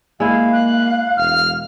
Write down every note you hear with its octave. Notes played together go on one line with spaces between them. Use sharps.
G#3 A#3 E4 F5
F#6
E1 F6